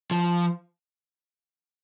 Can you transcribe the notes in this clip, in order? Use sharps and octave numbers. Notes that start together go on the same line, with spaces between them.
F3